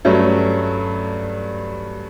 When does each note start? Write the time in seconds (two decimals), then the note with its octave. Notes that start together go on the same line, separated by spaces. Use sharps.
0.05 G2 F#3 A3 C#4